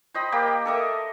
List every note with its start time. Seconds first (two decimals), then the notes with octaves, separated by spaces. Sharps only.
0.14 C5 D#5 G5 B5
0.32 A#3 G4 G5
0.65 A4 A#4 D#5 E5